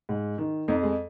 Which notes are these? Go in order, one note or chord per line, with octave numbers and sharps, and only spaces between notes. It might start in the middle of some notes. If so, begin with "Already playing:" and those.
G#2
D#3
F2 D#4
G#3